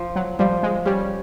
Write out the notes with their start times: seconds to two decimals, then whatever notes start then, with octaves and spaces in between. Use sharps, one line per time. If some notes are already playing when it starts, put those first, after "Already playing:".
Already playing: F3
0.16 F#3
0.39 F3 G3
0.63 G#3
0.85 G3 C#4